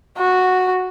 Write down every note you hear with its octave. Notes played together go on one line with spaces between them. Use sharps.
F#4